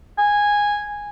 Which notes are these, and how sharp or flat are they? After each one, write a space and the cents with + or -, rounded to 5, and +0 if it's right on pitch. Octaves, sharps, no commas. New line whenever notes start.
G#5 -10